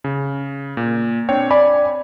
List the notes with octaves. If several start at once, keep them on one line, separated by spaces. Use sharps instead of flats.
C#3
A#2
C4 D4 C#5 G5
D5 G#5 B5